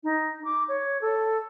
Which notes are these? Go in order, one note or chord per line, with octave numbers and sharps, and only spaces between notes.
D#4
D6
C#5
A4